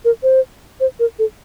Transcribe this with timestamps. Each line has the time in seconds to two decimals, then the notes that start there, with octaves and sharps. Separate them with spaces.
0.05 A#4
0.23 C5
0.80 C5
0.99 A#4
1.19 A4